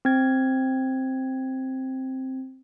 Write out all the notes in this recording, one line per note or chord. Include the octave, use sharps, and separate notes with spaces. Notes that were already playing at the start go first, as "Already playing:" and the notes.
C4 G#6